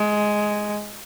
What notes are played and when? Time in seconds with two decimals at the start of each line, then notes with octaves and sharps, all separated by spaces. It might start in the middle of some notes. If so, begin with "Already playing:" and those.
Already playing: G#3